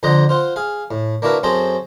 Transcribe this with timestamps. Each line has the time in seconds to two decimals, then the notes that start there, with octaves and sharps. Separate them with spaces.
0.03 F2 D3 C5 D#5 F#5 A#5
0.29 F4 C5 F#5
0.56 G#4 F5
0.91 A2
1.22 A#3 D4 E4 F#4 A#4 B4
1.43 F#2 C4 G#4 A4 C5 A#5